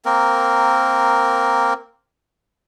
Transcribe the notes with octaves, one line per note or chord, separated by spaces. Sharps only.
A#3 C4 A#4